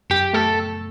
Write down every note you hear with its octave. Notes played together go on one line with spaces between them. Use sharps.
F#2 G4
A3 A4